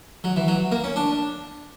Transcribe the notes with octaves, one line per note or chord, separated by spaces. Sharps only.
F#3
E3
F#3
A#3
C#4
D4